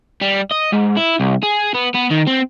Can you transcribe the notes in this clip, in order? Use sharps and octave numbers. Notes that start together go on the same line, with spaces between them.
G3
D#5
G#2
E4
C2
G#4
B3
B3
D#3
C4